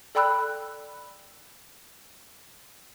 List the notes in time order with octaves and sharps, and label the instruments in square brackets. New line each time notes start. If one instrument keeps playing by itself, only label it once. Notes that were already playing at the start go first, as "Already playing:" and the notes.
[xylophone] A4 D5 G5 B5 E6 F#6